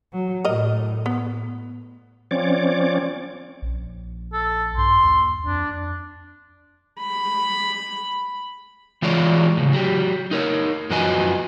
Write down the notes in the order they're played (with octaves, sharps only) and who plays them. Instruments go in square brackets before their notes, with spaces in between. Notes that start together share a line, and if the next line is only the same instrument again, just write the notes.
[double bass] F#3
[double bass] A2 [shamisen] A#4 D#5
[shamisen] B3
[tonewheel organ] F3 C4 C#4 C#5 D5 D6
[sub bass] A#1
[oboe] A4
[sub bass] G2 [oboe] C6
[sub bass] D#2
[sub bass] F2 [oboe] D4
[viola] B5
[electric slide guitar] E3 G#3 F4 G#4 C#5 D5
A2 C#3
F#3 G4
D#4 A#4 C#5
F#2 F3 F#4 B4 D#5 G#5